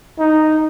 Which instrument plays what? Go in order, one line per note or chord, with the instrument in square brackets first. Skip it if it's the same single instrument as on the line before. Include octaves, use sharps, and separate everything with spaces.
[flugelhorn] D#4